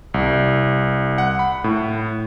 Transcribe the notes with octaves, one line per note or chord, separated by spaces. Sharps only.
C2
F#5
B5
A2